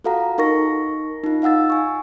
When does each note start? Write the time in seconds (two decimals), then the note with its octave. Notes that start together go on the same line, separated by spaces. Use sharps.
0.04 F4 F#4 A4 F5 F#5 A#5
0.38 D#4 A#4 C#6 A#6
1.24 D#4 F4
1.42 D#4 F5 F#5 E6 A6
1.70 G#5 C#6